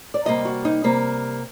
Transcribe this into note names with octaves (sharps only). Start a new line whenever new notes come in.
D5
C3 G3 A#3 D#5
F#4
D#4
C3 G3 A#3